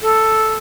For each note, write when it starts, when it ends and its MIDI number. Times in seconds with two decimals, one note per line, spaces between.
0.02 0.56 69